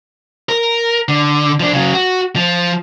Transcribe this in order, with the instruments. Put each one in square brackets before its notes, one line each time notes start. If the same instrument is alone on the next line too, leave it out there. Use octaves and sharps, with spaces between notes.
[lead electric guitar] A#4
D3
F3 D4
C#3 F#3
F#4
F3